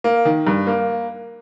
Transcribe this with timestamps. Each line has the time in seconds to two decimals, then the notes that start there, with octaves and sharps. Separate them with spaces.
0.04 A#3
0.25 D#3
0.47 G2
0.67 A#3